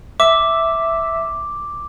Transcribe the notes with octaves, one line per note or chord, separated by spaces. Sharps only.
E5 D6